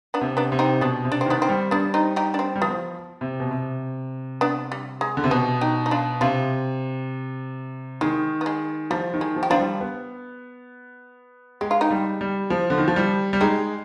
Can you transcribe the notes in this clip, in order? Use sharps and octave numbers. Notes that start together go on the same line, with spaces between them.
B3 D4
C3
B3 D4
C3
C4 D#4
B2 B3 D4
C3
D4
C4
D#3 B3 D4
C4
G3
G3 B3 D4
C4 D#4
D#4 G4
D4
C4
G3
F3 B3
C3
B2
C3
B3 D4
G3
G#3
D3
C3
B2 B3
D#4 G4
D#4
D4 F4
C3 D4 F4
D#3 G#3
B3
G#3
F3 G3
D#3
G#3
F3
G4
F3 D4 F4
G3
B3
G#3 G4
F4
D#4 G4
G3
G3
F3
D3
D#3
F3
G3
G3
G#3 D#4 G4